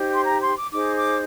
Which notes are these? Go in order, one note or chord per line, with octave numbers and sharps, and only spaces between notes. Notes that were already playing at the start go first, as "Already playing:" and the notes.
Already playing: D#4 G4 C5
C6
A#5
C6
D6
D#4 G#4 C5 D6
D6